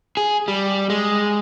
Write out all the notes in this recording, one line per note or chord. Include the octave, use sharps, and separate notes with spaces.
G#4
G3
G#3